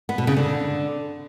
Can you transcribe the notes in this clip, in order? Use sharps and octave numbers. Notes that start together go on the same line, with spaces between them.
B3
B2
C#3
D3